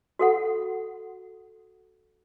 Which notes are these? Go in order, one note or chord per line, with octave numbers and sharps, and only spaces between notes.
F#4 A4 F#5